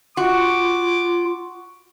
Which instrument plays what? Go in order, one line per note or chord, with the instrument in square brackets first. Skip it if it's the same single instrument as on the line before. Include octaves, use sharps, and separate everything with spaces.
[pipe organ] F4 [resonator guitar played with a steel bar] F#4 [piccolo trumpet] D6